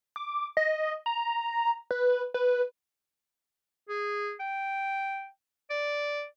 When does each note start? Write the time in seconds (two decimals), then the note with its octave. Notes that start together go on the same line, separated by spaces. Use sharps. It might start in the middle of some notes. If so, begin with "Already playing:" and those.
0.16 D6
0.57 D#5
1.06 A#5
1.91 B4
2.34 B4
3.89 G#4
4.40 G5
5.70 D5